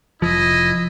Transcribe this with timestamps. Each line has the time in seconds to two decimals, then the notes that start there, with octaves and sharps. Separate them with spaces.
0.22 F1 F3 E4 D#5